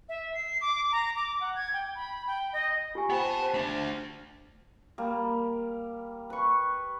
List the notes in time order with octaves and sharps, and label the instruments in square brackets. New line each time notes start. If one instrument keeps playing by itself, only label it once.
[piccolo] E5
C7
D6
A#5
D6
F#5
G#6
G5
B5
G5
D#5
[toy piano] F4 G4 G#5
[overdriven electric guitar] B3 A5 [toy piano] C5 G5 B5
[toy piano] C5
[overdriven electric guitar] A3 D4
[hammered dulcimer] G3 A#3
B4 C#6